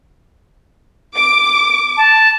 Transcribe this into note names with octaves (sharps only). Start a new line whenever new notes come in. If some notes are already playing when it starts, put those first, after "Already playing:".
D6
A5